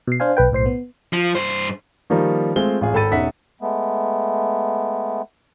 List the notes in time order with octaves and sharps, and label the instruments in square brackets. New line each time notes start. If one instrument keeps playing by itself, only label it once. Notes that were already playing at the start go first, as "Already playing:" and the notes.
[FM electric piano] B2 C7
D4 C5 F5 G#5
B1 B4 G5
B1 A2 C5 C7
B3
[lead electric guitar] F3
G2 C5
[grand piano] D#3 F3 G3 A#3 D#4
G#3 A3 C4 F4 F5 G7
A1 F4 G#4
G#1 A4 G5 B5 A6 D#7
E1 C#4 D#4 E5 F#5 B6
[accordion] G#3 A3 B3